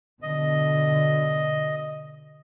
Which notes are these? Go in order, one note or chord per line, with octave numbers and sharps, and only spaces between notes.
B2 D3 D#5